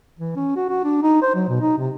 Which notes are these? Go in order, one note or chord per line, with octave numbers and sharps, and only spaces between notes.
E3
C#4
F#4
F#4
D4
D#4
C5
F#3
B2
D#4
C3